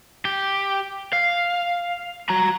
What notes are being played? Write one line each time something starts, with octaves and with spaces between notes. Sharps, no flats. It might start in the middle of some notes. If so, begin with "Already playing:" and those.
G4
F5
F#4 A#5